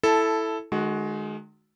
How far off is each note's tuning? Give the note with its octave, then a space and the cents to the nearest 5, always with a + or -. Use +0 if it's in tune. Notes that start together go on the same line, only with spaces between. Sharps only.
E4 +0 A4 +0 A5 -10
D#3 -40 G#3 +20 F#4 +0